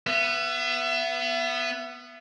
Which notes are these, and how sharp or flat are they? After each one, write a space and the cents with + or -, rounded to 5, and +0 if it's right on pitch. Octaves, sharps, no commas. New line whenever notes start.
B3 +0 E5 +35